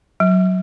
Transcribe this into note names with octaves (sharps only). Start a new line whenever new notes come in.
F#3